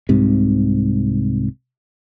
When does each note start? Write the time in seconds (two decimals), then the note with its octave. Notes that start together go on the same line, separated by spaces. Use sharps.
0.09 C2 G#2 C3